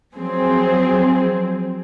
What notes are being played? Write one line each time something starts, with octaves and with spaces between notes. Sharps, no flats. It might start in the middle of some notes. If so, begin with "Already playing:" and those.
F3 F#3 C4 G#4